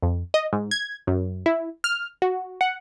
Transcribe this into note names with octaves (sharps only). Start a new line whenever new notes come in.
F2
D#5
G#2
G#6
F#2
E4
F6
F#4
F#5